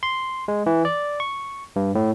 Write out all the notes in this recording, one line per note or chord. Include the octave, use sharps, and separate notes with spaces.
C6
G#3
E3
D5
C#6
G2
A2